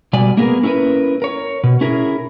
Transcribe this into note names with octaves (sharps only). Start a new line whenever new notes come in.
B2 G3 D5 G#5
A#3 B3 G#4 A#4
C#4 E4 G#4 A#4 B4
A#4 C#5
B2
C#4 E4 G#4 A#4